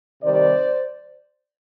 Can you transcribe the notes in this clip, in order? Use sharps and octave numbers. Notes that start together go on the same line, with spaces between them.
C3 D#3 G3 C5 D5